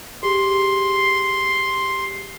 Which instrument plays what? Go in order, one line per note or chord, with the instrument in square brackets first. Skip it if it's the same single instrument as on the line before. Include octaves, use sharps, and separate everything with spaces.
[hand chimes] G4 G#4 [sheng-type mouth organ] C6